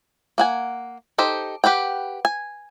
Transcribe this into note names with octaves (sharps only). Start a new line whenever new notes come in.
A#3 F#5 G#5
D#4 G4 A4 C5
G4 B4 F#5 G5
G#5